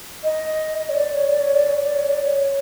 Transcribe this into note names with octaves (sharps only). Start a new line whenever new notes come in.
D#5
D#5
C#5
D5
C#5
D5
C#5
D5
C#5
D5
C#5
D5
C#5
C#5